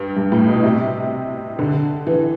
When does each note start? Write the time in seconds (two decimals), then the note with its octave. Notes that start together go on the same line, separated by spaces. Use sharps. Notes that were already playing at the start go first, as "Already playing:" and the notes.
Already playing: G2
0.17 G2
0.32 A2
0.48 B2
0.64 C3
1.59 D3
2.07 E3